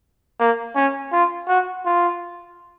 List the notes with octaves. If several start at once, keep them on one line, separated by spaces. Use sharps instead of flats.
A#3
C#4
F4
F#4
F4